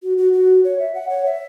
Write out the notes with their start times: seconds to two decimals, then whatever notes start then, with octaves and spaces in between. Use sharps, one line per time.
0.03 F#4
0.18 F#4
0.33 F#4
0.64 C#5
0.79 E5
0.94 F#5
1.09 C#5
1.26 E5